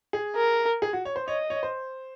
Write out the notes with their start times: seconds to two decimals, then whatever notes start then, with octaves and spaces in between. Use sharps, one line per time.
0.13 G#4
0.36 A#4
0.82 G#4
0.93 F#4
1.05 C#5
1.16 C5
1.28 C#5 D#5
1.50 C#5
1.63 C5